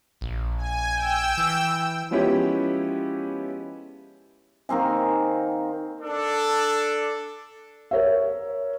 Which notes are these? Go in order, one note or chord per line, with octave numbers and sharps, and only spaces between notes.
A#1
G#5
G5 E6
E3
F3 G#3 B3 C#4 E4 G4
D#3 A#3 C4 G#5
D4 A4
A#4 C#5 E5